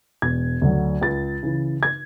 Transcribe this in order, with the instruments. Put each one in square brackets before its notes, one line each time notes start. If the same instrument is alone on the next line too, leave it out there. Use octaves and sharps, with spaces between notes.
[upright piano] E1 G#6
D2 D3 F#3
C#2 A6
C#3 E3
G#6